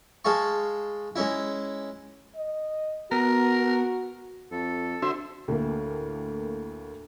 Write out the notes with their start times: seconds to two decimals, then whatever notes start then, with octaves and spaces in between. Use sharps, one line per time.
0.25 G#3 G#4 F5 A5 C#6
1.16 G#3 C#4 E4
2.36 D#5
3.12 B3 F#4 A#4
4.51 F2 A4
5.02 D3 D4 F#4 C5 E5
5.48 D2 A2 A#3